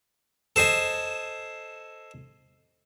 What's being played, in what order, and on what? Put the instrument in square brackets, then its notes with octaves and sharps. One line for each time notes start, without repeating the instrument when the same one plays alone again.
[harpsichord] A4 C5 D#5 G#5